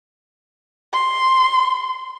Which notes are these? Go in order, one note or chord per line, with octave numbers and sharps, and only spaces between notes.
C6